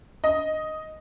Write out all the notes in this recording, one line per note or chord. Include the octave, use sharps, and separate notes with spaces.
D#5